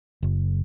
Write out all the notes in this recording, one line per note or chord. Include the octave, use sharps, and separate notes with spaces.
F#1